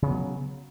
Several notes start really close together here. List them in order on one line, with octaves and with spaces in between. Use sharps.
C#3 B3 F#3